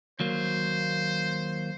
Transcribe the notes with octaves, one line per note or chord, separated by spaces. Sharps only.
D#2 F#3 A#3 C5